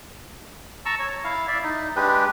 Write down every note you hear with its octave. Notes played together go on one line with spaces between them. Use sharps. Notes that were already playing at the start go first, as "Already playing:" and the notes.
A5 A#5 C#6 E6
C#5
E4 F5
D5 E5
D#4
G#3 D4 G4 B4